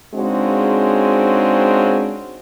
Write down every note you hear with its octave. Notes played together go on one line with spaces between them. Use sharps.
C#3 G#3 C4 D4 D#4 F#4